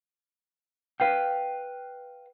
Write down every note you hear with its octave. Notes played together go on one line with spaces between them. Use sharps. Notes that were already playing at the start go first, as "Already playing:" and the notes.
B4 F5 G5